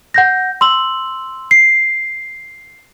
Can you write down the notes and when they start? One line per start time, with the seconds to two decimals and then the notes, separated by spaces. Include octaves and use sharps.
0.14 F#5 G6 A#6
0.61 C6 E6 F#7
1.51 C7